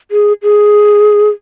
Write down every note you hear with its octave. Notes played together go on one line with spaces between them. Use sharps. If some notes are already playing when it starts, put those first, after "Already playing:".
G#4
G#4